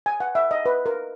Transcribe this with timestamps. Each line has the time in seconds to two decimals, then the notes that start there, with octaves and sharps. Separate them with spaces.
0.06 G#5
0.20 F#5
0.35 E5
0.51 D#5
0.66 B4
0.86 A#4